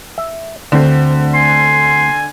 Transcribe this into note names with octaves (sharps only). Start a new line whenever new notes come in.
E5
D2 D3 C4
G#5 C6